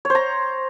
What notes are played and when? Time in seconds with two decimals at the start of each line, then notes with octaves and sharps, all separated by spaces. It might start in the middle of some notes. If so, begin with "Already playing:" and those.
0.05 C#5
0.10 C5
0.15 A#5